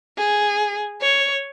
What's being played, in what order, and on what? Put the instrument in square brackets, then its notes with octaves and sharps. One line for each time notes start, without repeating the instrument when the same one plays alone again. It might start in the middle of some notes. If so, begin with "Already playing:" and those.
[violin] G#4
C#5